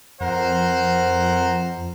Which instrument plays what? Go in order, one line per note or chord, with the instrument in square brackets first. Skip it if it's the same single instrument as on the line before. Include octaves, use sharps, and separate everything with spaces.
[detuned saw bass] F2 [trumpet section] A#4 C5 F#5